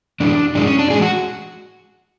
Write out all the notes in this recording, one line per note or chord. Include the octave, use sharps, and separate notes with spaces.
F#2 E3 G#3 D4
F#2 E3 G#3 D4
C#4
D4
A2 E3 G#3 G#4
F#4